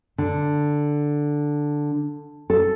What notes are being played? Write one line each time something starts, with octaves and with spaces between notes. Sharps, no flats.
D3
A4